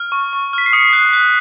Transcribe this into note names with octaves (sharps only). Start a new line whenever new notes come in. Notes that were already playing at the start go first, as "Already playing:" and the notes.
Already playing: F6
C#6
C#6
F6 B6
C7
D#6 C#7
F#6
F#6